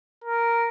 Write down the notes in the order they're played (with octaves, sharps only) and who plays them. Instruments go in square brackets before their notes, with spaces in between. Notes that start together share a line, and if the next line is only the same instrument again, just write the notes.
[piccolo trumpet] A#4